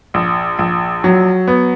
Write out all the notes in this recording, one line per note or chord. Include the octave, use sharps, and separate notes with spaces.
A#1
A#1
F#3
B3